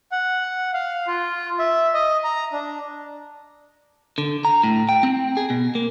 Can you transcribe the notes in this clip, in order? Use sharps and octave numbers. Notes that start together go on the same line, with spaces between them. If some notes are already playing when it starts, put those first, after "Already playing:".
F#5
F5
F4
E5
D#5
A#5
D4
D3
A#5
A2
G5
C4
G#4
B2
A#3